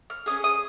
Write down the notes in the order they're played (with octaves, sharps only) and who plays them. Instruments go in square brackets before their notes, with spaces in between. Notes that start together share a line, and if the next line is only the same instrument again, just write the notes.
[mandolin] F6
C#4 F4 G#4 D#6
D#6